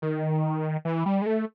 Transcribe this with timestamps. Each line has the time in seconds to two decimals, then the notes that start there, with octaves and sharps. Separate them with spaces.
0.02 D#3
0.85 E3
1.06 G3
1.22 G#3
1.26 A3